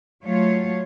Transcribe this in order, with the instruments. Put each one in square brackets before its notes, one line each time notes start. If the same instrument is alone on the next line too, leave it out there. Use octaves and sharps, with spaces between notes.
[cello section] F#3 A3 F4 C#5